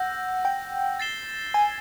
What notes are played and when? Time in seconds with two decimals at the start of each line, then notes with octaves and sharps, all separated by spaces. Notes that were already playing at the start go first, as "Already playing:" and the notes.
Already playing: F#5 E6 G6 A#6
0.45 G5
1.00 A6 C7 E7 G7
1.54 G#5